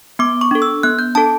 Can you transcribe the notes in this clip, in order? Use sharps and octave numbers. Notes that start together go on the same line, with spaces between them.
B3 D6
C#6
D4 A4
E6
B3 F#6
G6
D4 A4 A5